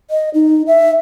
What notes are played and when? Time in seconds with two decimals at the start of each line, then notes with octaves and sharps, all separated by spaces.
0.11 D#5
0.34 D#4
0.67 E5